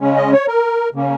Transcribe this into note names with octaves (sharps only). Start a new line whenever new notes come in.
C#3 G#3 C#4
D#5
C#5
A#4
C#3 A#3 C#4